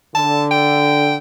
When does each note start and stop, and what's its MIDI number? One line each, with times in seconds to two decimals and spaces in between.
0.15 1.16 50
0.15 0.44 81
0.51 1.16 79